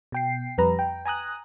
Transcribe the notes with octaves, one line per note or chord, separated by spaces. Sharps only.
B2 G5 C7
F2 G3 B4 A#5
G5
G#5 A#5 D#6 F#6